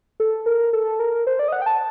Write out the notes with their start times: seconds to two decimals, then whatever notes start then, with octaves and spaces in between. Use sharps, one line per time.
0.20 A4
0.46 A#4
0.73 A4
0.99 A#4
1.27 C5
1.39 D5
1.48 D#5
1.52 F#5
1.62 G5
1.66 A5